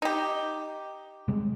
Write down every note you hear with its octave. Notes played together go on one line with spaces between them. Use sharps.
D#4 G4
C3 G3 G#3